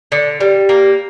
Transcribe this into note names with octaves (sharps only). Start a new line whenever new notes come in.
D3
G3
A#3